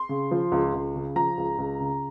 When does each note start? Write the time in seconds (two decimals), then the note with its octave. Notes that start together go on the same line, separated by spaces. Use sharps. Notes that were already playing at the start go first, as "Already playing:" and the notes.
Already playing: C6
0.09 C#3
0.31 F3
0.52 C#2
0.74 C#2
0.95 C#3
1.16 F3 A#5
1.38 C#2
1.58 C#2
1.80 C#3